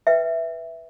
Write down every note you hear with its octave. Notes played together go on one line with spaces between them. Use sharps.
B4 E5 G5